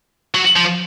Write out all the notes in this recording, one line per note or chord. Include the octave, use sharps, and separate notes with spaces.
F#3
F3